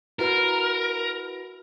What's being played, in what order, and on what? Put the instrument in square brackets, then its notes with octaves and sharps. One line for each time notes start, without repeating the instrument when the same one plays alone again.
[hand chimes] E4 F#4 B4 [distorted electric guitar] A#4